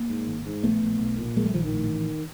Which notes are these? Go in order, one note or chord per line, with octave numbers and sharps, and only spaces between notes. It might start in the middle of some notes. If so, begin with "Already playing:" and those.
Already playing: A#3
G#2
G#1
G#2
A#1 A3 B3
A#1
B1
A#2
A#1 G#3 A#3
G3 A3
A#1 D#3 F3
D#3
A2
A1